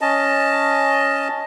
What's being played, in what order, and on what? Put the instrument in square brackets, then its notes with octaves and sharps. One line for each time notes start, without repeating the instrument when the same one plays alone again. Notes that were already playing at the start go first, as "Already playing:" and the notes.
[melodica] C#4 D#5 A5